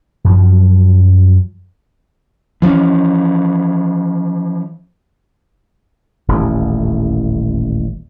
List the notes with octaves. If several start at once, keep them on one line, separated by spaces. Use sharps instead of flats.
F#2 F3 F#3
E3 F3 A#3 C#4
D#1 A1 E2